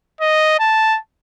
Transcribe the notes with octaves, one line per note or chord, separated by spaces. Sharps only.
D#5
A5